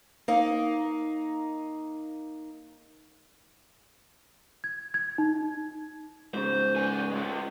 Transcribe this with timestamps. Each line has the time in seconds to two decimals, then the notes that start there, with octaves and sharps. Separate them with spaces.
0.28 A#3 D#4
4.64 G#6
4.94 G#6
5.18 D#4
6.34 G#2 C#3 C5
6.76 B3 G#5
7.12 G#3 F4